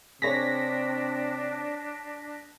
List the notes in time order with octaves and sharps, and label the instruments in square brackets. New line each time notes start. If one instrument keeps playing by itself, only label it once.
[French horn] C3 [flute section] D4 [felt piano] G#4 C#5 [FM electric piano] A#6 B6